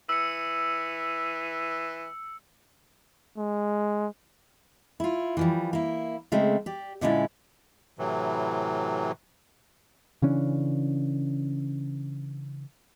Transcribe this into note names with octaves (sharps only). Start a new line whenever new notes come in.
E3 E6 C#7
G#3
E4 F4
E3 F3 G3
A#3 E4
C#3 G#3 A3 C4
G4 D5
A#2 D3 G#3 C#4 E4 D5
A2 C3 E3 F#3
C#3 E3 C#4 D4